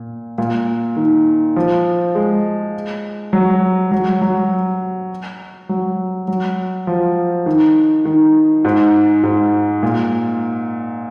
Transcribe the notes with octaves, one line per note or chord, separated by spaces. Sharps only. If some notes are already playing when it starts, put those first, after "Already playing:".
Already playing: A#2
A#2
D#3
F3
G#3
F#3
F#3
F#3
F#3
F#3
F3
D#3
D#3
G#2
G#2
A#2